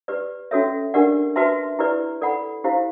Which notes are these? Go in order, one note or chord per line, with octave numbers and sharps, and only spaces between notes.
G4 B4 D5
C#4 F#4 A4 C#5 E5
D4 G4 A#4 D5 F#5
F#4 B4 E5 A5 C6
E4 G4 B4 D5
A4 D5 F#5 B5
E4 G4 C5 F5